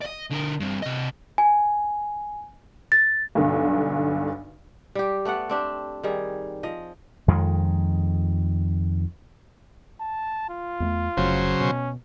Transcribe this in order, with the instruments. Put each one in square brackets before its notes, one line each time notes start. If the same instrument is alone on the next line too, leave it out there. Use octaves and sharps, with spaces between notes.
[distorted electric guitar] D5 D#5
D3 A#4
G2 C4
C3 D#5
[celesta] G#5
A6
[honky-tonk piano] B1 G2 D3
[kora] G3 G4
A3 B3 D5 F#5
C4 D4 G4
D#3 G3 G#4
F3 D#5
[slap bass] F2 D#3 G#3
[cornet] A5
F4
[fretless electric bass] E2 G#3 A3
[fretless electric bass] F1 [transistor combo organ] C#3 F#3 C5
[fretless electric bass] B2 [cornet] C#4